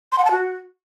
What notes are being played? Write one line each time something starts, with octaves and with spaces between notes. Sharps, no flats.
C6
F#5
A5
F#4